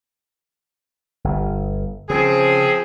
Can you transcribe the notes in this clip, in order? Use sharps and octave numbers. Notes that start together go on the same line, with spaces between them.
G1
C#3 F3 C4 G#4